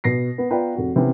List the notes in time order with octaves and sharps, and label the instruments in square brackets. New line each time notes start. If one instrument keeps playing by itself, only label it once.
[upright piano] B2 A#6 C7
B3
B3 F4 B4 D5 G5 A#5
F1 F#4
C3 E3 B3 C#4